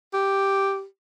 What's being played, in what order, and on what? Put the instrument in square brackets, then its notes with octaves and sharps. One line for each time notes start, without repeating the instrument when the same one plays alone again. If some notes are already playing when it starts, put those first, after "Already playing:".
[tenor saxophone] G4